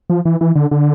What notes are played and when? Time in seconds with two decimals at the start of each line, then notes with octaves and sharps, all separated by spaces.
0.10 F3
0.25 E3
0.41 E3
0.56 D3
0.71 D3